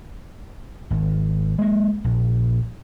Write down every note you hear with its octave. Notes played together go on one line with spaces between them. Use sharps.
G#1
G#3 A#3
A#1